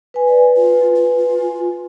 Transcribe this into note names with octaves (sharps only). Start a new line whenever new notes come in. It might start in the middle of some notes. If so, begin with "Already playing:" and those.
B4 G#5
D5
F4
F4